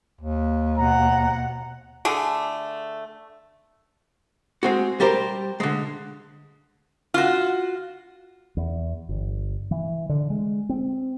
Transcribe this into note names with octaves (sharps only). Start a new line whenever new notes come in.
D#2
B2 F#5 A#5
D3 A3 G#4
G#3 C4 F#4
G3 G4 A#4 C5
D3 G#3
F4 F#4
E2
G1
E3
D3
G#3
C4